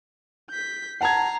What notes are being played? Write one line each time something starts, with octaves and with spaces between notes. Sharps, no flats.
G6 B6
F#5 A5 A#5 G#6 C7